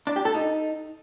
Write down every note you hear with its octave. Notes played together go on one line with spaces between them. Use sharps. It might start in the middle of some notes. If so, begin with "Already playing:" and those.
D4
G4
A4
D#4